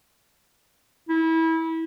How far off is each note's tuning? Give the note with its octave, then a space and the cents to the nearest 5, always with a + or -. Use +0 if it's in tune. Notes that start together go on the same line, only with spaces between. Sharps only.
E4 -25